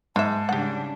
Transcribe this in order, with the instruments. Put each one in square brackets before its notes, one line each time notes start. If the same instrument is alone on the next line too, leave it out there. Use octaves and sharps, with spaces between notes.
[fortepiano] G#2 [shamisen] G#3 E5 [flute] A5
[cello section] C#3 G3 D4 [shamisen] G4 F#5